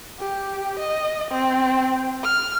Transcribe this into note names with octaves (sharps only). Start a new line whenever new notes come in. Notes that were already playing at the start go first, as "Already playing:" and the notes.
G4
D#5
C4
F6